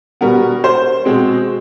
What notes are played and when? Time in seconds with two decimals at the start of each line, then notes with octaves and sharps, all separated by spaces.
0.21 B2 G3 B3 A#4
0.64 C5
1.05 B2 G#3 C4